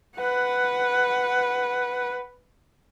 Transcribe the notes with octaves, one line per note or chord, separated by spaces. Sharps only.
B4 F#5